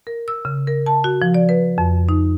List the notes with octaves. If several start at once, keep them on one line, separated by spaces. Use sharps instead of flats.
A#4
E6
C#3
A#4
A5
F#4
F3
D5
B4
F2
D#4